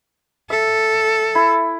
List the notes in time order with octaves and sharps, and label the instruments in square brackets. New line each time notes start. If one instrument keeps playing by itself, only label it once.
[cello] A4 [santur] E5
[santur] E4